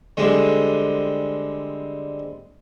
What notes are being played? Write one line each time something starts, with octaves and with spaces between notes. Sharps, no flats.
D3 G3 G#3 C4